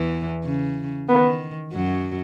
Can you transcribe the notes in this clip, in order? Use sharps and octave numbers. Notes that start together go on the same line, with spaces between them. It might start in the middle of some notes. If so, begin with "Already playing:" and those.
Already playing: E2 E3
C#3
D#3 B3
F#2 F#3